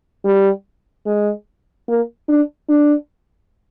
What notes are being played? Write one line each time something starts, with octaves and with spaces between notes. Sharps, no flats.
G3
G#3
A#3
D4
D4